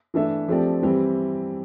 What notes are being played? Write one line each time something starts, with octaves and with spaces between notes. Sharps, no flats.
E3 A3 D4 A4 E5
F3 A3 C4 G4 D5
E3 G3 C4 G4